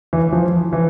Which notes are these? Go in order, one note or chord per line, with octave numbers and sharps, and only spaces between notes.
E3
F3
E3